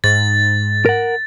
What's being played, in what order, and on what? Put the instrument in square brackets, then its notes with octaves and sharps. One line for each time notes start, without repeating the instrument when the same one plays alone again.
[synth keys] G#2 [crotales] A6
[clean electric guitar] A#4 F#5